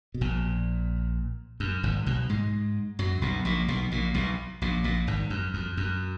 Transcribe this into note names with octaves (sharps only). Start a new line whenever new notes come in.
B2
A#1 A#2
F#2
G#1 G#2
B1 B2
G#2 G#3
F#2 F#3
B1 B2
A#1 A#2
B1 B2
A#1 A#2
B1 B2
A#1 A#2
A#1 A#2
G#1 G#2
F#2
F2
F#2